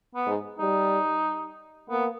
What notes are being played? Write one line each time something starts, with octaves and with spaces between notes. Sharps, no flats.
B3
G#2
G3 D#4
A#3 B3